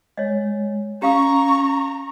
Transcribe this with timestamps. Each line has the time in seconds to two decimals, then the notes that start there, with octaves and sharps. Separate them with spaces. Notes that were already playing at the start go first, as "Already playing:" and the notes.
0.17 G#3 C#5 D#5
1.02 C#4 G4 F5 A#5 C#6 D#6